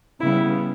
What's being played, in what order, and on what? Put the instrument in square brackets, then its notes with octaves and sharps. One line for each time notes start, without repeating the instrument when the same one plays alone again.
[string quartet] C#3 G3 B3 E4